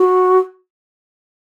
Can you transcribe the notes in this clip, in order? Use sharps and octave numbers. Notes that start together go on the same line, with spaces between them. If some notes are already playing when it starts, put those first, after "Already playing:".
Already playing: F#4